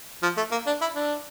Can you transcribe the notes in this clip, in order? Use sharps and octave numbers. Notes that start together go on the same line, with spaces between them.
F3
A3
A#3
D4
E4
D4